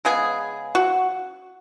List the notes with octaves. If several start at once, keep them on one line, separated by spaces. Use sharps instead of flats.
C#3 G#3 B3 G#4
F#4